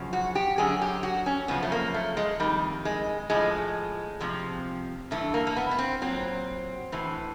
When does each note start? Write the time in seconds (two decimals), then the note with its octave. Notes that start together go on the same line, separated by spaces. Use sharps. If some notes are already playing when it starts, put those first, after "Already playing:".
Already playing: F#2 C#3 F3
0.13 F#4
0.35 G4
0.58 F#2 D3 F#3 G#4
0.81 G4
1.03 F#4
1.26 C#4
1.48 F#2 C#3 F3 B3
1.62 A3
1.72 A#3
1.94 A3
2.17 G#3
2.40 C3 D#3 G3
2.43 F2
2.85 G#3
3.30 A2 F3 G#3
4.20 F2 C3 F3
5.11 G2 E3 A3
5.34 A#3
5.47 A#3
5.56 B3
5.71 B3
5.79 C4
6.02 A#2 F#3 C4
6.92 A2 E3